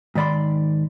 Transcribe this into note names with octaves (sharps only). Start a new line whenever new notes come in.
G#2 D#3 D5 B5 C6